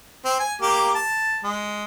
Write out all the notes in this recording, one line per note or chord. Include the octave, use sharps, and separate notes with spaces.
C4
G#5
A#3 G4 D6
A5
G#3